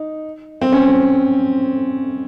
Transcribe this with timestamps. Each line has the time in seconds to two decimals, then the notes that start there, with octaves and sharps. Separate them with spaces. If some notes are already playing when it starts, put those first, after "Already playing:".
Already playing: D#4
0.62 C4
0.72 C#4